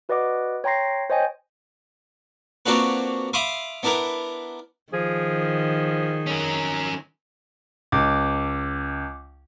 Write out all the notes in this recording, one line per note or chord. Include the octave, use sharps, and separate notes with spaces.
F#4 B4 D5 D#5 F#5 D6
C#5 G5 A#5 C6 A#6 C7
C5 C#5 D#5 G5 G#5
A#3 C4 D4 F4 F#4 B4
E5 F5 B5 C6 D6 D#6
B3 D4 E4 A#4
D#3 F3 G#4
C#4 A#4
C#2 D6